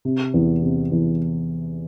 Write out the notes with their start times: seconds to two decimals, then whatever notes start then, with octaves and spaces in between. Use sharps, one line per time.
0.05 C3
0.34 E2
0.63 C3
0.92 E2